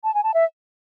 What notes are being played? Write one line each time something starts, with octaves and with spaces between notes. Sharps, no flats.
A5
G#5
A5
E5